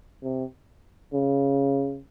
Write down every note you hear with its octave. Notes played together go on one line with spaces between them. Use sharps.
C3
C#3